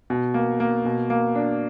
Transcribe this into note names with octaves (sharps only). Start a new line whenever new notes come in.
B2
A#3
A#3
B2
A#3
D4